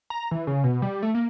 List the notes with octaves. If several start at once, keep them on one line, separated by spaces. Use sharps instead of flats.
A#5
E3
C#3
B2
G3
A3
A#3